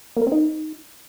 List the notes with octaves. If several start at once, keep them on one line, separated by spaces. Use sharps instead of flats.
A#3
A#4
C4
D#4